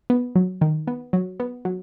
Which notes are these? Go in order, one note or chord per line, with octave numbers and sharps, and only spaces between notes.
B3
F#3
D#3
B3
F#3
B3
F#3